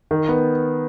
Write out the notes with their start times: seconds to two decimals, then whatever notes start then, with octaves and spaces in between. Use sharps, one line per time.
0.11 D#3
0.29 B3